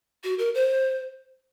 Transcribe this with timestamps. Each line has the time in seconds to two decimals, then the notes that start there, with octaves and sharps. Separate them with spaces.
0.24 F#4
0.39 A#4
0.55 C5